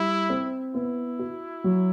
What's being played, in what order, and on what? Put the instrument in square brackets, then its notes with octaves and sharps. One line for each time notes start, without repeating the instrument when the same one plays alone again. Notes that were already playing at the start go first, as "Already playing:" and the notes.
Already playing: [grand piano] G3 [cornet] E4
[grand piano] C4
[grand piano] B3 [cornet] E4
[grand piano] F#4
F#3